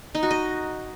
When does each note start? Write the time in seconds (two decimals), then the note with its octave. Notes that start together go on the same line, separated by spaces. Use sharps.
0.15 D#4
0.23 F#4
0.31 D#5